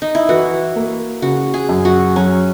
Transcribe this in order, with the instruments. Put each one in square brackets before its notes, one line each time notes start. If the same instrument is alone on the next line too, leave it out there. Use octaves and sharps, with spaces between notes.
[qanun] D#4
E4
[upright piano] E3 [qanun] F#4
[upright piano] A#3
[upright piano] C#3 [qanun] F#4
[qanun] G#4
[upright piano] F#2
[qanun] F#4
[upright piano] F#3 [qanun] C#4